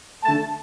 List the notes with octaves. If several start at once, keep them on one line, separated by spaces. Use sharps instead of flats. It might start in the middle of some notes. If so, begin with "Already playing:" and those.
D3 A3 A5